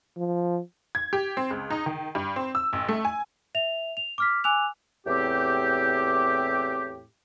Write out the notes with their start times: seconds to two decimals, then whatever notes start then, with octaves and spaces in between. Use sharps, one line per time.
0.17 F3
0.95 G#6
1.13 G4
1.37 C4
1.51 C#2
1.70 D#4
1.86 D#3
2.15 G2
2.36 C4
2.55 E6
2.73 A1
2.89 A3
3.05 G#5
3.55 E5 F7
3.97 F7
4.18 D6 F6 B6
4.44 G#5 D6 E6 F#6 F7
5.06 E2 A2 C4 G4